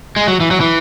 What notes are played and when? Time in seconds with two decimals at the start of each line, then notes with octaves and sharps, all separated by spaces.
0.16 G#3
0.28 F#3
0.40 E3
0.51 F#3
0.60 E3